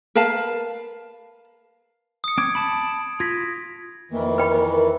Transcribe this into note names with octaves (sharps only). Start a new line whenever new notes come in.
A#4 B4 F5 A5
D#6 C#7
C4 D6 G#6 D7
A5 B5
F4 G#6 A#6 B6
F2 D#3 E3 A#3
A#4 B4 G5 B5